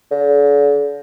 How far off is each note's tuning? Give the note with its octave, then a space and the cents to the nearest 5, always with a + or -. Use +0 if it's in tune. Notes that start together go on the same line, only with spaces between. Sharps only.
D3 -40